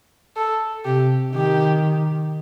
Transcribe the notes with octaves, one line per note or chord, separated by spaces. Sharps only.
A4
C3 G4
D#3 G4